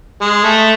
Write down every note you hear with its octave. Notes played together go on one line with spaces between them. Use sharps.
G#3
A3